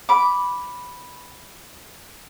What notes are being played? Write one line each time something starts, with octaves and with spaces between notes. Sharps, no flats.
B5 D6